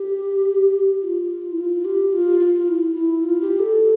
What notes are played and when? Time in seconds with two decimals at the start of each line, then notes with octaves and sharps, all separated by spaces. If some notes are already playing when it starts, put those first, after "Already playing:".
Already playing: G4
1.02 F4
1.52 E4
1.58 F4
1.85 G4
2.13 F4
2.40 F4
2.68 E4
2.95 E4
3.23 F4
3.42 G4
3.60 A4